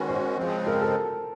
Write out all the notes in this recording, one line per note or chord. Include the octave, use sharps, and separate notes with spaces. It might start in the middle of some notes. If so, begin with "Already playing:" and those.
Already playing: D#3 G#3 C#4 F#4 B4
C5
C#3 F3 G#3 C4
A#4
A4